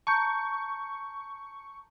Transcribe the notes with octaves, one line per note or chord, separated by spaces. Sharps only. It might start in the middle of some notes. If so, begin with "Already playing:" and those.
A5 A#5 C#6 G6